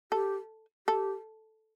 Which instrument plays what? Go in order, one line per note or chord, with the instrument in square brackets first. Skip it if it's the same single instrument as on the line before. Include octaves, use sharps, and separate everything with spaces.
[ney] G4 [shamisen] A4
[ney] G4 [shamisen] A4